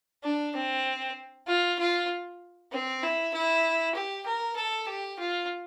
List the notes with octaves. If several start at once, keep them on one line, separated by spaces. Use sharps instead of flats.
D4
C4
F4
F4
C4
E4
E4
G4
A#4
A4
G4
F4